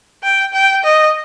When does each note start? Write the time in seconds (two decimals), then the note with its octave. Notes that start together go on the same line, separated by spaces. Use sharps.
0.24 G5
0.54 G5
0.84 D#5